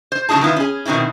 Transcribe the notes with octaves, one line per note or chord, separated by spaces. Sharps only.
C5
C#3 F#3 D#4 E4 G#4 A5
D#3 B3 E4 F4
C#4 G#4
B2 D#3 C4 C#4 E4